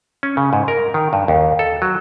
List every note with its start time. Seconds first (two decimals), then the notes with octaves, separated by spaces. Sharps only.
0.23 C#4
0.37 C#3
0.53 G#2
0.68 A#4
0.94 D#3
1.13 G2
1.28 D#2
1.59 A4
1.82 F#3